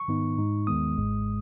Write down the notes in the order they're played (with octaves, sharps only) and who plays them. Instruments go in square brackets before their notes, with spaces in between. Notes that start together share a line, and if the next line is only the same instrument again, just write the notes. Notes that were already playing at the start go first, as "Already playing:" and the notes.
Already playing: [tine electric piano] C#6
G#2 D#3 B3 D#4
G#2 G#3 D#4
D#2 D#3 G#3 B3 D#6
G#1 G#2 G#3